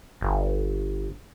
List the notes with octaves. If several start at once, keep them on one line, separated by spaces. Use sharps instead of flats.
G1